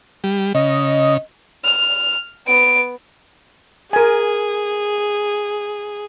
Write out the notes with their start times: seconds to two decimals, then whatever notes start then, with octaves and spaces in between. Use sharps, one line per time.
0.24 G3
0.54 C#3 D#5
1.65 F6
2.47 B3 D7
3.93 G#4 A#4 G#5